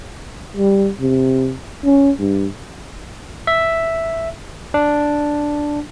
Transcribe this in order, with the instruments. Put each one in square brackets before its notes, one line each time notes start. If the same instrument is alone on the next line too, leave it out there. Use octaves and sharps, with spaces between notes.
[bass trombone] G3
C3
C#4
G2
[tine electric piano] E5
D4